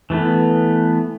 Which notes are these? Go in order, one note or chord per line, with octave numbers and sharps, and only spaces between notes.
E3 A3 B3